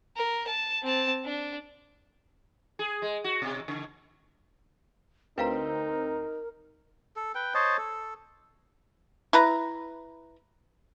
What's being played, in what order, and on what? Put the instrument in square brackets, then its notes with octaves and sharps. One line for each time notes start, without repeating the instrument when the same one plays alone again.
[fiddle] A#4
A5
C4 A5
D4
[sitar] G#4
G#3
F#4
B2
C#3
[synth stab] D2 C4 G6 [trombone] D#4 [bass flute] A#4 [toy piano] B4 F5 A#5
[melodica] A4
B4 G5
C5 C#5 D#5 A5
A4
[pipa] E4 B4 A#5